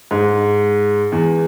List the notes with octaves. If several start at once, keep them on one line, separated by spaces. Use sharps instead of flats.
G#2
E2